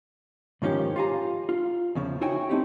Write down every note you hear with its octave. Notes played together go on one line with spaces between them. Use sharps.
G#2 D#3 F3 C#4 G4
F4 G4 F5 G#5 A#5
F4
E2 C#3 F3
D#4 E4 F#4 C#5 G5 G#5
A3 A#3 C4 D#4 E4 G4